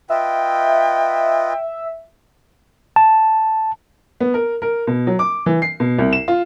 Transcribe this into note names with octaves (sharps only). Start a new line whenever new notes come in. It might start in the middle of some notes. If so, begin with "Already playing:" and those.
F4 B4 D#5 E5 G5
A5
B3
A#4
A#4
B2
F#3
D6
E3
C7
B2
C2
E7
F4